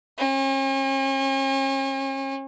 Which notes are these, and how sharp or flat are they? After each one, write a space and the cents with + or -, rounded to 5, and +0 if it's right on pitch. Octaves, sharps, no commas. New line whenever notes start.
C#4 -40